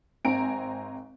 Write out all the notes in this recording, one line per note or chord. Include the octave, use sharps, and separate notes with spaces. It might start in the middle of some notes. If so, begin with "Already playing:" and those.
G#1 C4 G5 G#5 A#5 D7